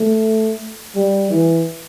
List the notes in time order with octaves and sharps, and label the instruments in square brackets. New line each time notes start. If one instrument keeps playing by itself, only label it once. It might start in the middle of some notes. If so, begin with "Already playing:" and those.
Already playing: [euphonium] A3
G3
E3